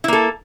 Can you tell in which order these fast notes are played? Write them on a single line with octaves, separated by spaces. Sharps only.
E4 A#3 A4